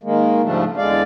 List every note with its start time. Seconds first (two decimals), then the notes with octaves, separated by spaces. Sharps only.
0.04 D#3 G#3 A#3
0.43 G#2 C#3 F3 G3 A3 D4
0.77 E2 D3 G#3 D5 F5